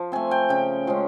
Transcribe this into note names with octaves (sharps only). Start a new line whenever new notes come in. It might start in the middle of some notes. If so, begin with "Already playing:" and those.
Already playing: F3
A3 C4 G#5
G5
C#3 G5
F3 G#3 C#4